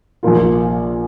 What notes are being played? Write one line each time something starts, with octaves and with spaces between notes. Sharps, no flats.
A#1 A#2 A#3 F4